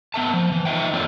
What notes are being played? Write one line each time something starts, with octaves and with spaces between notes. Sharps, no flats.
B3 C4 E5 A5
F3
E3
D#4 F4 D#5 E5 G5
A#3 C4 D4 F4 A4 C#5